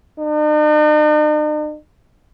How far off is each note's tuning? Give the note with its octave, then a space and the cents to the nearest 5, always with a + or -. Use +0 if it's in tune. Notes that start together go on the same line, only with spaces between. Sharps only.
D#4 -45